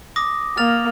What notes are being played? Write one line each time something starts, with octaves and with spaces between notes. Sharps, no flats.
D6 D#6 A#6
A#3 F6 A6 F7